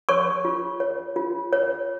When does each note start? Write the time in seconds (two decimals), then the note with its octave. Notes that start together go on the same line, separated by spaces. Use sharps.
0.09 C#5 C#6
0.45 F4
0.80 C#5
1.16 F4
1.53 C#5